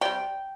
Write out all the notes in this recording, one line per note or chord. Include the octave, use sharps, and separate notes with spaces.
C3 G3 D5 G5